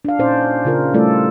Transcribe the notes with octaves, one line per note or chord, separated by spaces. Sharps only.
D4 F5
A#2 C#4 D#4 C5 D5
C#3 F4 A#4
G3 A3 E4 F4 A4 D5